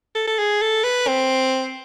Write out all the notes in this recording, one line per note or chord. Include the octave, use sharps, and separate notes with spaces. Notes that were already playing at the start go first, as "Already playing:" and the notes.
A4
A4
G#4
A4
B4
C4